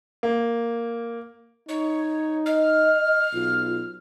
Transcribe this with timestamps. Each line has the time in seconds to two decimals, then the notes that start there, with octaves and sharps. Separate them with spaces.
0.23 A#3
1.69 D#4 C#5
2.46 D#5 F6
3.34 B1 F4